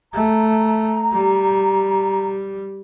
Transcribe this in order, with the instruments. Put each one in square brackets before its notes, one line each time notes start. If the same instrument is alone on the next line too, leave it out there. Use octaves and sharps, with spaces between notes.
[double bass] A3 [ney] A#5
[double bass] G3